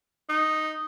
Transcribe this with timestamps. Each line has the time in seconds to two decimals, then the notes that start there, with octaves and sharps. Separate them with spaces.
0.29 D#4